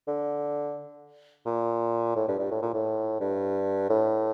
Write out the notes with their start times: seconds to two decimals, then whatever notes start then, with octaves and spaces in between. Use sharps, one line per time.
0.07 D3
1.46 A#2
2.16 A2
2.28 G2
2.39 G2
2.51 A2
2.62 A#2
2.73 A2
3.20 G2
3.89 A2